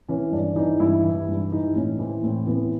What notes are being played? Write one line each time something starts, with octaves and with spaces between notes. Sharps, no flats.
E3 C#4
G2 D4
E3 D#4
G2 E4
E3
G2
E3 D#4
A2 C#4
E3 C4
A2 C4
E3 B3